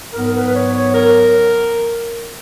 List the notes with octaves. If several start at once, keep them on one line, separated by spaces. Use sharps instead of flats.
G#2 F#3 B3 A#4
A#4
B4
B4
C#5
C#5
A#4